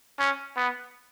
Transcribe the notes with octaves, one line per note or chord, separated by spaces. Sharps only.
C#4
B3